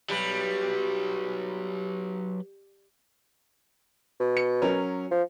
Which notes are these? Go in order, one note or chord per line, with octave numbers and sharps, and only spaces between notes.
F#3 G3 B4
B2
C#7
F#3 C#4 A#4
F3